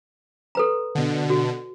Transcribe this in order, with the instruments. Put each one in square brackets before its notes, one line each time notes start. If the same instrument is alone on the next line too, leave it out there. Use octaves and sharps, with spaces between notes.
[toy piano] A4 B4 A#5
[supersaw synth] B2 D3
[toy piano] F#4